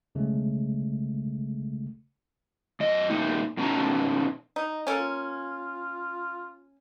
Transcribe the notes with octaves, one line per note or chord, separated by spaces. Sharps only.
B1 C#3 G#3 A3
F#2 D#5
F2 A#2 C#3 A#3 D#4
F2 B2 C#4 D#4 A5 A#5
D#4
A#3 C#4 A4
F4